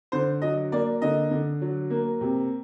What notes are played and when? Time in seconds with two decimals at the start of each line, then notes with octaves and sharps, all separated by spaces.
0.12 D3 C5
0.42 F#3 D#5
0.72 A#3 D5
1.02 D3 D#5
1.31 D3
1.61 F#3
1.90 A#3
2.21 C3